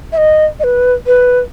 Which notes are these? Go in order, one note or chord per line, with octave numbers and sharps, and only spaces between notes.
E5
D#5
D#5
B4
B4